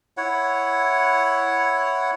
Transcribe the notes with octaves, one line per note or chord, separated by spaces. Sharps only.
E4 C#5 F#5